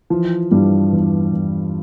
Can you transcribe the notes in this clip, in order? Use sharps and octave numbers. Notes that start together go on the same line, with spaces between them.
E3 F3
G2 E3 G3
E2
E2